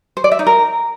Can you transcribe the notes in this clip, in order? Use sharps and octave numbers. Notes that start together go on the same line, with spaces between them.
C5
D5
E5
D#4
A#4